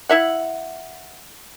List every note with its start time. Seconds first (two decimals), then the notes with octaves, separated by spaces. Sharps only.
0.09 E4 E5 F#5